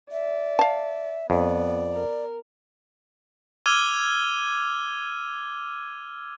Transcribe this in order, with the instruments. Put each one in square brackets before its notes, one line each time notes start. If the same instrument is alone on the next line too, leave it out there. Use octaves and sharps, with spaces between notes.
[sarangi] D5 [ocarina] E5
[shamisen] F5 A5
[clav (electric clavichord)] F2 [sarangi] B3 [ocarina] D5
[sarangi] A#4
[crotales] D6 E6 F6 G#6 D#7 G7